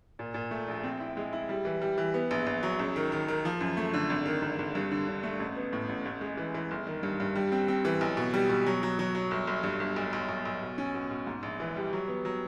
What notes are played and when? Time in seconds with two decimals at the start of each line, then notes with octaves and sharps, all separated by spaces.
0.19 A#2
0.34 A#2
0.51 A3
0.68 A#1
0.83 C4
1.00 E4
1.17 G#3
1.33 E4
1.49 G3
1.65 E3
1.81 G3
1.98 E3
2.14 B3
2.31 A#1
2.47 A#1
2.63 F#3
2.79 C#2
2.96 D#3
3.12 D#3
3.28 D#3
3.45 F3
3.61 F#2
3.77 A3
3.94 D3
4.10 G#1
4.26 D#3
4.42 G#1
4.59 G#1
4.75 G2
4.91 D3
5.08 D3
5.23 A3
5.40 A1
5.57 B3
5.73 A2
5.89 A1
6.05 A1
6.21 G#3
6.37 E3
6.54 E3
6.71 G1
6.87 D#3
7.03 G2
7.20 G2
7.36 G3
7.52 C4
7.68 C4
7.85 E3
8.01 B1
8.17 B2
8.34 G3
8.49 B2
8.66 F#3
8.83 F#3
8.99 F#3
9.15 F#3
9.31 G1
9.47 G1
9.63 G2
9.80 G1
9.96 B1
10.13 B1
10.29 B1
10.45 B1
10.62 B2
10.78 C#4
10.94 B2
11.11 B2
11.27 G#2
11.43 A#1
11.60 E3
11.76 G3
11.93 F#3
12.08 B3
12.25 F#3